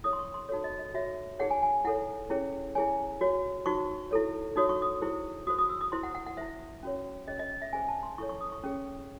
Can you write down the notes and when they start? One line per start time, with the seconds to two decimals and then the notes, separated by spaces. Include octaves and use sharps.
0.04 E4 G#4 C#5 D#6
0.13 C6
0.19 C#6
0.34 C6
0.49 D#4 F#4 A4 C#5
0.64 D#5
0.79 D#5
0.94 F#4 C#5 E5
1.39 D#4 G#4 C#5 F#5
1.51 G#5
1.63 G#5
1.85 E4 A4 C#5 F#5
2.30 C#4 E4 G#4 C#5
2.75 E4 G#4 C#5 G#5
3.21 F#4 C#5
3.66 D#4 F#4 C5 C#6
4.11 E4 A4 C#5
4.56 D#4 F#4 C#5 D#6
4.69 C#6
4.82 D#6
5.02 E4 G#4 C5
5.47 F#4 D#6
5.50 C5
5.58 D#6
5.69 E6
5.81 D#6
5.92 E4 C5 C6
6.03 F#5
6.15 F#5
6.26 F#5
6.37 E4 C5 E5
6.83 C#4 F#4 C#5
7.28 C#4 G#4 C#5 D#5
7.39 D#5
7.51 D#5
7.62 E5
7.73 C#4 G#4 C5 G#5
7.89 A5
8.03 C6
8.18 E4 A4 C#5 C#6
8.29 C#6
8.41 D#6
8.52 C#6
8.64 C#4 G#4 C#5